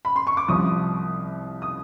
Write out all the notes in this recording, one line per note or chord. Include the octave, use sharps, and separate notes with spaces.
B5
C6
C#6
D6
C2 C3 F3 D#6
D#6